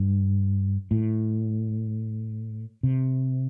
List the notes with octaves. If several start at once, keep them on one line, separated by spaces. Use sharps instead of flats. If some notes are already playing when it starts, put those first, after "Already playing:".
Already playing: G2
A2
C3